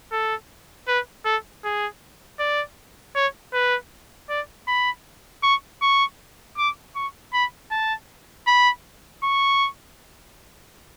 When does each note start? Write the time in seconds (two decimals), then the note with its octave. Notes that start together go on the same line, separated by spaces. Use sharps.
0.12 A4
0.88 B4
1.25 A4
1.64 G#4
2.39 D5
3.15 C#5
3.53 B4
4.30 D5
4.68 B5
5.43 C#6
5.82 C#6
6.58 D6
6.96 C#6
7.33 B5
7.71 A5
8.47 B5
9.23 C#6